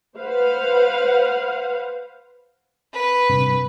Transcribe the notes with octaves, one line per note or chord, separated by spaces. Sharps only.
B4 C5 F5 F#5
B4
G2 C3